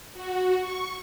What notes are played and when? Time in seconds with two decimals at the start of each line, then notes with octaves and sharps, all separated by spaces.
0.14 F#4
0.58 C#6